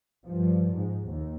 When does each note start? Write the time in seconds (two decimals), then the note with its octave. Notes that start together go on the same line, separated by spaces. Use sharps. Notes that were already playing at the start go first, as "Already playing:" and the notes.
0.24 G2 F3
0.73 G#2
1.08 D#2